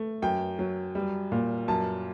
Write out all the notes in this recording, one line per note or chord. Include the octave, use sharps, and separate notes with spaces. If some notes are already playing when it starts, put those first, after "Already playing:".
Already playing: A3
F#2 G5
F#3
G3
A#2
F#2 A5